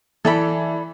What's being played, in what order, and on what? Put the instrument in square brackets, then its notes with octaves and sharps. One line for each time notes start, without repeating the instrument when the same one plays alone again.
[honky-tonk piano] E3 [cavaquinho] A4 D5 B5